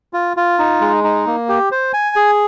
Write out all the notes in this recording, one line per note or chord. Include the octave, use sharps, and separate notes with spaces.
F4
F4
D#4
G#3
D#4
A#3
G4
C5
G#5
G#4